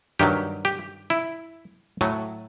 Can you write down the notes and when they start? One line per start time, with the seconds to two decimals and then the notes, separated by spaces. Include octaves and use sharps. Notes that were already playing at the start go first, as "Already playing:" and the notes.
0.19 G2 D#3 F#3 G4
0.65 G4
1.10 E4
2.01 A2 F#3 A3